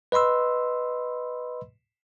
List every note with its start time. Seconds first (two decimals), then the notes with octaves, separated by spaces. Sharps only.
0.12 B4 D#5 B5 C6 E6